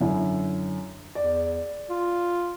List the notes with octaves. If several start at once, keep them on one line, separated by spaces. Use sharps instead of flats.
F#2 D3 E4
E2 D5
F4